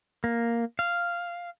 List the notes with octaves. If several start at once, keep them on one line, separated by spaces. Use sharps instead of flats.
A#3
F5